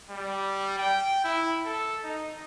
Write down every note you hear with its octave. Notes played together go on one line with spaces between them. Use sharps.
G3
G5
E4
A4
D#4